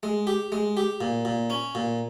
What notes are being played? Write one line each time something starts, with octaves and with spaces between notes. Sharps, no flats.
G#3
G4
G#3
G4
A#2
A#2
C#4
A#2